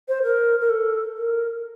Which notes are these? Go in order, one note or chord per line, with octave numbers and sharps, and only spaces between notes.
C5
A#4
A#4
A4
A#4